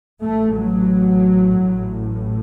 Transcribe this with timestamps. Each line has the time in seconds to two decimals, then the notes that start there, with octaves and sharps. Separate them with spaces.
0.22 A1 A2 A3
0.58 F#3
1.60 A1 A2